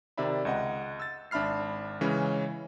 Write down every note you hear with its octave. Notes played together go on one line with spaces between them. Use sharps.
C3 D#3 D5 E5 B5
C#2 D#5 F#5
E6 A6
G#1 D4 E5 B5 F6 C7
C#3 E3 G#3 C#4